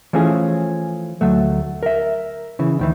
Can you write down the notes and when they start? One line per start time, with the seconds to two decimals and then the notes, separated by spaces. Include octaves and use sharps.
0.13 E3 F3 A3 C#4 G#4
1.21 D2 F#3 A3
1.83 A#4 E5
2.59 C#3 E3
2.79 D2 D#3 E3